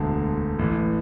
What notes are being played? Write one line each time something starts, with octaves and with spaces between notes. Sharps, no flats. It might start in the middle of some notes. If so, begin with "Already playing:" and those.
Already playing: E1 D2 D3 A5
A1 A2 E3